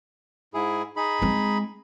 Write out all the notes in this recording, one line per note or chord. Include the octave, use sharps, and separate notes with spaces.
G#2 E4 G#4
D#4 G#4 B5
G#3 C4